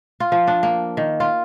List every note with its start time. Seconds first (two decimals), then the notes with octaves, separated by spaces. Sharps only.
0.20 F4
0.32 F3
0.47 D4
0.63 A#3
0.97 D#3
1.20 F4